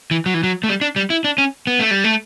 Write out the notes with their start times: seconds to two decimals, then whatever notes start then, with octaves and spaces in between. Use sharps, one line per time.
0.11 E3
0.26 F#3
0.34 E3
0.43 F#3
0.64 A3
0.69 G3
0.81 D4
0.96 G3
1.10 E4
1.24 D4
1.38 C#4
1.67 B3
1.79 A3
1.91 G3
2.04 A3